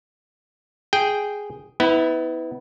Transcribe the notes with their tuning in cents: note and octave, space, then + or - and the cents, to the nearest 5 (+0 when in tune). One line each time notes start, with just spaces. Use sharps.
G#4 +0 G5 +0
B3 +20 E4 -25